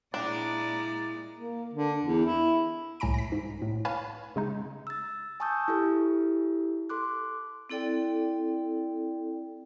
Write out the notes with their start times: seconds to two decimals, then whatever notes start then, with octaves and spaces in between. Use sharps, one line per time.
0.14 A#2 G#3 D4 E4 D5 A#5
1.35 A#3
1.73 D3
2.03 E2
2.26 E4
3.00 C2 A2 G#5 A#5 B5 D7
3.14 A#6 B6
3.32 G#2
3.62 A2
3.85 B4 C#5 F5 G#5 A5 B5
4.36 C#3 G#3 D#4
4.87 E6 A6
5.40 G#5 A5 C#6 D#6 E6 G6
5.68 E4 G4 A4
6.90 A4 C6 D6 F#6
7.70 C4 E4 A4 D5 G5